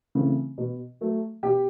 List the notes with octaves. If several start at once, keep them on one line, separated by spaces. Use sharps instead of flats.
C#3 E3 A3 C4
B2
F#3 A3
B2 G4